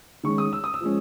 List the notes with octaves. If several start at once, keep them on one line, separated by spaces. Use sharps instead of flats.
D#3 G#3 C#4 C#6
D#6
E6
D#6
E6
F3 G#3 C#4